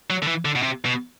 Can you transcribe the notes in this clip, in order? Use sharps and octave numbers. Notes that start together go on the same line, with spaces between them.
F#3
D3
E3
D3
B2
C3
B2